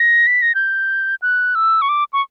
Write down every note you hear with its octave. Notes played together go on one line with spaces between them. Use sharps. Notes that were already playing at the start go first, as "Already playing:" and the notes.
Already playing: A#6
B6
A#6
G6
F#6
E6
C#6
D6
C#6